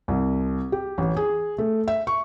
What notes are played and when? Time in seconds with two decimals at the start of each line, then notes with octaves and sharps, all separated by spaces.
0.08 C2
0.72 G4
0.98 A1
1.17 G#4
1.58 A3
1.88 E5
2.07 C#6